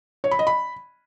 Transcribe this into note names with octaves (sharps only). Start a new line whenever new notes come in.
C#5
B5
D#5
B5